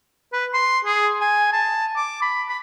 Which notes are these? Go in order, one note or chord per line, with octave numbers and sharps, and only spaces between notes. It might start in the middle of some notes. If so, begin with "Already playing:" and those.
B4
C6
G#4
G#5
A5
D6
B5
B5